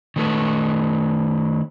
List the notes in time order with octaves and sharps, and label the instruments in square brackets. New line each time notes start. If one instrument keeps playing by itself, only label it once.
[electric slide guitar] D#3 A3 B4